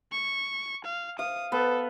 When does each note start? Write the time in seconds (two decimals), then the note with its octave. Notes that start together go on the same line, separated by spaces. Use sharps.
0.12 C#6
0.84 F5
1.19 F5 D#6
1.52 B3 A4